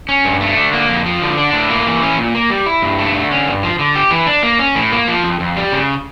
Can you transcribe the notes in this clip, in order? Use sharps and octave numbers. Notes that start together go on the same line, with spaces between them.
C#4
G2
A3
D3
A#3
F2
F3
D3
D4
A2
A#3
E3
C#4
A#2
A#3
G3
E4
G2
A3
D3
C#4
G2
F3
D3
G4
E3
D4
A#3
C#4
A2
A#3
F3
F2
F2
G3
C#3